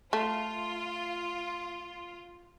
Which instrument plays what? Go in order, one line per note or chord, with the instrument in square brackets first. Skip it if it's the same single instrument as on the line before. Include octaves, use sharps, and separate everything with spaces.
[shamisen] A3 [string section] F4